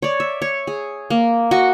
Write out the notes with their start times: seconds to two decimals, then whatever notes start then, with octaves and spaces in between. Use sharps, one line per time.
0.02 C#5 D5
0.20 E5
0.42 C#5
0.67 G#4
1.10 A#3
1.51 F#4 D#5 C#6